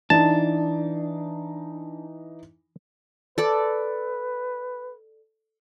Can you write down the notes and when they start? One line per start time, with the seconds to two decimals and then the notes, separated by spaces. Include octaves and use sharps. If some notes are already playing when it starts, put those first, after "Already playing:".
0.10 E3 D4 D#4 A5
3.38 A4 B4 D5